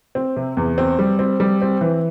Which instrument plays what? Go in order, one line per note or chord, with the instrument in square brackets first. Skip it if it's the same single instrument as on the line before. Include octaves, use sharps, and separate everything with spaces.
[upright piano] C4
C3
E2
C4
G3
C4
G3
C4
E3